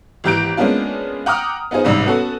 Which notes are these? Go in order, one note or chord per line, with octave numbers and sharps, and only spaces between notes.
G#1 E3 G4 A#5 G6 D7
G#3 A#3 B3 C#4 D4 F4
F#5 G5 A#5 D6 D#6 F6
B3 D#4 F4 G#4 C5
A1 G#2 C3 G3
B3 C#4 F#4 A4